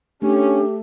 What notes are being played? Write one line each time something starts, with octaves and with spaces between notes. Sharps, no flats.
A3 C#4 D4 G4